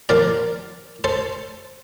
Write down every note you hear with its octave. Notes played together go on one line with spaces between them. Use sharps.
A#2 F3 A#4 D5
A4 C5